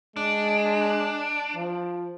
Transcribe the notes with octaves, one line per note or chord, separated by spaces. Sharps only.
G#3 D4
F3